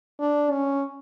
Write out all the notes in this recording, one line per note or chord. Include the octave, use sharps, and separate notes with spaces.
D4
C#4